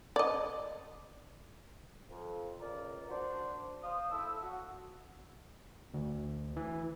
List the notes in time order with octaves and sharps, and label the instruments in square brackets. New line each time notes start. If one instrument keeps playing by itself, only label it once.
[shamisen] D5 D#5
[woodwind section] F2
C#2 A#4 D5
D4 F#4 C5
C5 F5 D#6
E4 A4 E6
F#4
[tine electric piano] D2
E3